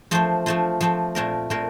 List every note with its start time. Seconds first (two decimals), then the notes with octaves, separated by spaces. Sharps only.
0.11 F3 A3 C4 F4 C5
0.46 F3 A3 C4 F4
0.81 F3 A3 C4 F4
1.15 A#2 A3 C4 F4 A#4
1.50 A#2 A3 C4 F4 A#4